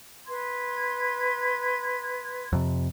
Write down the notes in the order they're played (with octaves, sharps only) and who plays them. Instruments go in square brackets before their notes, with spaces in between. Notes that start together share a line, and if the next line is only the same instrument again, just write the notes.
[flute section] B4 C6 G#6
[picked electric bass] F2 C3